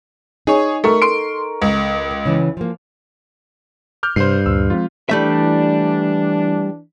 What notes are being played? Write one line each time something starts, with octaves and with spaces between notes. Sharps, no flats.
D#4 G#4 C#5
A3 A4 A#4 C#6
C6 D7
C#2
C#3 E3
F3 A#3
D6 F6 G6
G2 C3 C5 C7
D2 A#2 C5 E6
F3 G#3 C4 F4
E3 G3 A3 D4 E5